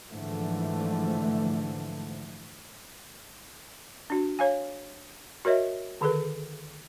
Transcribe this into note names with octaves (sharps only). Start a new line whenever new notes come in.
G#2 D3 E3 F3 A3
D4 F#4
C#5 F5 G#5
F#4 A#4 C#5 D#5 E5
D3 D#3 G#4 A4 B4